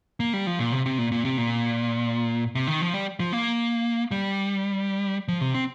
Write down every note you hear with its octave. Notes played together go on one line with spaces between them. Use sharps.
A#3
G3
F3
A#2
C3
C3
A#2
A#2
C3
A#2
C3
D#3
F3
G3
F3
A#3
G3
F3
C3
C4